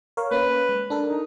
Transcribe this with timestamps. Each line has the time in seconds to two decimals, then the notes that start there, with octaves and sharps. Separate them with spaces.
0.17 A#4 C#5 F5
0.31 A#3 C#4 B4
0.69 G#3
0.90 D4 A4 A#4
1.09 D#4